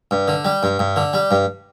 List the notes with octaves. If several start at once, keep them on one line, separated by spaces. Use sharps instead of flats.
G2
D3
G3
G2
G2
D3
G3
G2